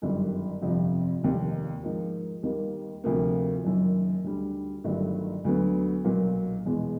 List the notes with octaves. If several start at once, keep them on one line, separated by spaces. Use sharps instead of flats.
G1 F#2 D#3 G3
G1 F2 C3 F3
F1 D#2 D#3
G#2 F3 A#3 D#4
D#2 D#3 G3 A#3
D2 C3 F3 A#3
F#1 F#2 D#3
D2 D3 G3
G1 G2 D#3 F#3 A3
D2 D3 F#3 B3
B1 A#2 F#3 A#3
E2 B2 G#3 B3